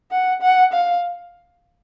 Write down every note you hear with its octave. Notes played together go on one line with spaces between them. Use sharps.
F#5
F#5
F5